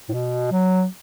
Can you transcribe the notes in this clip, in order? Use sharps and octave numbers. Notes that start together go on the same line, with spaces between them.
A2
B2
F#3